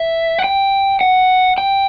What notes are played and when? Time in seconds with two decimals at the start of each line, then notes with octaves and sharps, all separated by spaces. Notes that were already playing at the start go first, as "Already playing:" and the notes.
Already playing: E5
0.39 F#5
0.44 G5
1.01 F#5
1.58 G5